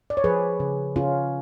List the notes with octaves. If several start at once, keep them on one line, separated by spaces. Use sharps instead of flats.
D5
C#5
F3 G#4 B4
C#3
C#3 C#4 F4